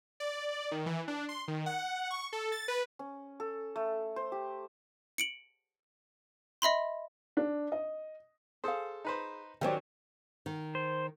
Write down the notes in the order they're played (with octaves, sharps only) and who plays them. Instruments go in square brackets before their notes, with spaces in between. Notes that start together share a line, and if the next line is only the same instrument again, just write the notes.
[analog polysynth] D5
D#3
E3
D4
C6
D#3
F#5
C#6
A4
A6
B4
[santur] C#4
A4
A3
C5
G4
[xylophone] C#7 D7 F#7
D#5 E5 B5 C6
[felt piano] D4
D#5
[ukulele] G#4 F5 [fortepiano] A4 C5
[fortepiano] D#4 B4 C5
[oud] D#3 F#3 C#4 [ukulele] G4 C5 D5
[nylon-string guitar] D#3
[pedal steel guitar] C5